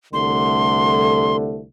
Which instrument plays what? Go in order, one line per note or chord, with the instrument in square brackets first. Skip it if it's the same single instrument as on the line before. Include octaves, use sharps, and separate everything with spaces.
[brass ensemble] C2 D3 A3 [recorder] C6